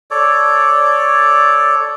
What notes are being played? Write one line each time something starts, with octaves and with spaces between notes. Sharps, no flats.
A4 C#5 D5